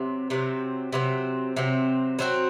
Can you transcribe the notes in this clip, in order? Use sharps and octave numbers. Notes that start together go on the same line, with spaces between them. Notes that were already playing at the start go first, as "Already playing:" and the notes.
Already playing: C3 F#3 C4
C3 F#3 C4
C3 F#3 C4
C3 F#3 C4
F#3 C4 F#4